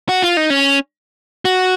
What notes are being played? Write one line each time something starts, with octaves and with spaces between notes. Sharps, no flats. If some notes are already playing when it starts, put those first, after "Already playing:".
F#4
F4
D#4
C#4
F#4